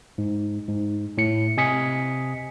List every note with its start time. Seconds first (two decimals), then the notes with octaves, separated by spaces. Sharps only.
0.18 G#2
0.69 G#2
1.18 A2 C#7
1.57 C3 D#5 G#5 D#6 B6 C#7